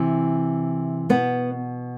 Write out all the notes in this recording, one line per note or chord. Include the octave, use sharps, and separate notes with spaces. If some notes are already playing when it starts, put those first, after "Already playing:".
Already playing: C3 E3
B2 B3